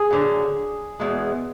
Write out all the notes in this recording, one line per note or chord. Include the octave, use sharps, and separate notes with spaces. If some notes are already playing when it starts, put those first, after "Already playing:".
Already playing: G#4
F#2 D3 F#3
E2 B2 G#3